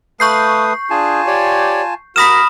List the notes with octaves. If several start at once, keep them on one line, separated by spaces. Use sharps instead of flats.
A3 B4 F5 C#6 D#6 G6 C7
D4 F4 G#4 G#5 A5
G4 C#5 D5
F#4 A#4 B5 D#6 F6 A#6 B6 E7